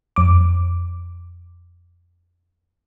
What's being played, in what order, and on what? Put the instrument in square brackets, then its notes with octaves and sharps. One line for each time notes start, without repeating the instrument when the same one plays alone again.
[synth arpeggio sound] F2 D6